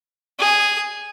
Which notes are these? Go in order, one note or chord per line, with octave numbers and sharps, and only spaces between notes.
G#4